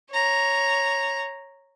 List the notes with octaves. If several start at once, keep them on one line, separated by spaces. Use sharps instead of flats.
C#5 A#5